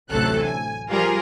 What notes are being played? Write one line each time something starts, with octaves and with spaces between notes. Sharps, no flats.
A1 D2 C3 F#3 A4 F#6
G#5
F3 G3 F4 G#4 A#4